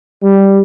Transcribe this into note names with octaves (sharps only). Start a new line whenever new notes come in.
G3